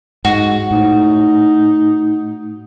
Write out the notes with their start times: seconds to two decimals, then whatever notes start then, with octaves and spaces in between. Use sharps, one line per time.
0.25 G#2 F#4
0.71 A2 D#4